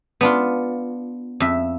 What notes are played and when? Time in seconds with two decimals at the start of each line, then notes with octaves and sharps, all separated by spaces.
0.21 B3 D4 F4
1.40 F2 E5